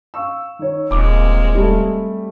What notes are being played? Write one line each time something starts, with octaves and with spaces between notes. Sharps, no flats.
F5 C#6 E6
D#3 C#5
D#1 G#3 A#3 C4 D6
G3 A3